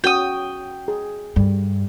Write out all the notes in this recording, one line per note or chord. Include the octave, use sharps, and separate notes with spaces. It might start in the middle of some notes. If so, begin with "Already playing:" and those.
C#4 F#4 G5 D#6
G#4
G2 G3